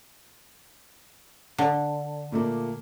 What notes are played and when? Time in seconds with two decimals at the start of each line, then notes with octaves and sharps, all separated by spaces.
1.58 D3
2.32 A#2 A3 A#3